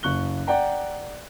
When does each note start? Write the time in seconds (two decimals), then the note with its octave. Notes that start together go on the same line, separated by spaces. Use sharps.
0.03 F#1 C#6 F#6 G7
0.47 D5 F#5 G5 A#5